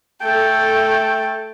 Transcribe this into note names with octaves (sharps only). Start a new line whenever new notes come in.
A3 A4 G5